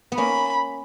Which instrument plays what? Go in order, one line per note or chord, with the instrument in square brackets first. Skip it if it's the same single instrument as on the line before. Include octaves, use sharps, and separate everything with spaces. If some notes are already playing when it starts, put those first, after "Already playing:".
[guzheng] B3
[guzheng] A#3 C#4 [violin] B5